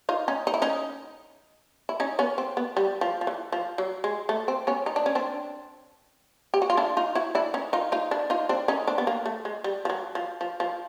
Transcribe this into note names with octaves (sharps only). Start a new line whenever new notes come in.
D#4 F4
C#4 D#4
D#4
E4
C#4 D#4
E4
C#4 D#4
B3 C#4
C4
B3
G3
F3
F3
E3
F3
F#3
G#3
A3
C4
B3 C#4
D#4
D4
C#4
C4 D4
G4
F#4
F4
D4 E4
D#4 F4
E4 F#4
D4 E4
C#4 D#4
D#4 F4
D#4 F4
D4 E4
D#4 F4
C4 D4
C#4 D#4
C4 D4
B3
A#3
A3
G#3
G3
F3
F#3
F3
F3
F3